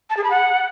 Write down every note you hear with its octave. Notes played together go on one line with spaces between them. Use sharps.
A5
G#4
B5
F#5